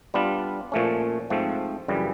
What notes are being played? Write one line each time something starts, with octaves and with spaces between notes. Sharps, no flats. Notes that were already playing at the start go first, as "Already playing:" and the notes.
G3 B3 D4 F4
A#2 F3 A3 C#4
G#2 F3 A3 C4
F#2 C#3 E3 G3